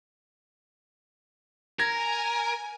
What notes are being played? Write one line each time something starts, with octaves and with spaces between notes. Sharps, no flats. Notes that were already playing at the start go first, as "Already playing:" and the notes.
A#4 G#5 G#6 A#6